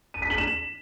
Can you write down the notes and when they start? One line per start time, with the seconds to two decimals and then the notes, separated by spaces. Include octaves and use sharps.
0.14 D#7
0.22 B6
0.30 F#7
0.38 E7